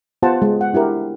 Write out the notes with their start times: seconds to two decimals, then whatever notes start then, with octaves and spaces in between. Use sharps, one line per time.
0.22 B3 F4 G4 C5 F#5 A5
0.42 G#3
0.61 F#5
0.73 D4 E4 G4 A#4